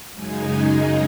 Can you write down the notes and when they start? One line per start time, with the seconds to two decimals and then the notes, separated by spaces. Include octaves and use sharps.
0.12 F#2 C#3 G#3 D#4 G#4